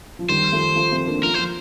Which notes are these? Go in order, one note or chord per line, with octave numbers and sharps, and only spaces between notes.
F3
D#3 G3 C5
F3 A3
F3 A3
A3 C4
A#3 D4
F3 A#4
C5
F3